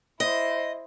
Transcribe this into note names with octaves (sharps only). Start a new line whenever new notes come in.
E4 C5 D#5